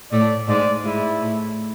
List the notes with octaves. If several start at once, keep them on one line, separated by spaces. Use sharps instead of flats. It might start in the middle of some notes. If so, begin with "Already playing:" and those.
A2 A3 D5
G#2 G#3 D5
G#2 G#3 E4
A2 A3